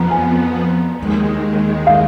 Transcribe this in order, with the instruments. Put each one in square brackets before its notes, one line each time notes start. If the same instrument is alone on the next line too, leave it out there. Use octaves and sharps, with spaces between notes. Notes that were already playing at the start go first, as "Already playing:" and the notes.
Already playing: [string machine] F2 F3 B3 [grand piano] A#5
[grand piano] G#5
[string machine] D#2 D#3 G#3
[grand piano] F5